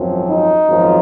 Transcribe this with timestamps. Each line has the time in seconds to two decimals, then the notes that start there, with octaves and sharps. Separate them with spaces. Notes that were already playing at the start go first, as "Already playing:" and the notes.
Already playing: G#1 F#2 F3 C4
0.27 D#4
0.68 G#1 F#2 F3